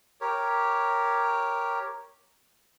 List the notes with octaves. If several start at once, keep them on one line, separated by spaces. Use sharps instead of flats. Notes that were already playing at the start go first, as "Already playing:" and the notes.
G4 A#4 C#5